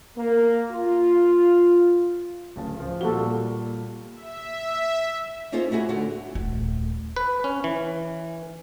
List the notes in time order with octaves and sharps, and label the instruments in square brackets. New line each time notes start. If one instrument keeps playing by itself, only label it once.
[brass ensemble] A#3
F4
[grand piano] D1 C#3 A5
F3 F4
[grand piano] A#2 G3 G7 [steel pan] F#4 A4
[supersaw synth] E5
[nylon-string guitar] A#3 C#4 D#4 F4 G#4 C5
A3 E4 F#4 G#4
D2 D3 F#4
[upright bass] D#1 A3
[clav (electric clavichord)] B4
C#4
E3